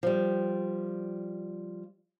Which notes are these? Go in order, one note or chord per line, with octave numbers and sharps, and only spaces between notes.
F3 G3